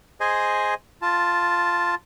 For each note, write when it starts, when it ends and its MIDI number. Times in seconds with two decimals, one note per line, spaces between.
0.20 0.74 68
0.20 0.74 72
0.20 0.74 75
0.20 0.74 80
1.02 1.95 65
1.02 1.95 81